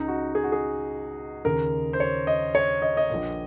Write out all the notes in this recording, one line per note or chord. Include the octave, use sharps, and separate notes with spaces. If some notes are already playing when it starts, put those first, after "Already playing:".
Already playing: C#2 C#3 D#4
F#4
G#4
F#4
G#4
D#2 C#3 A#4
C5
C#5
D#5
C#5
D#5
D#5
A#1 A#2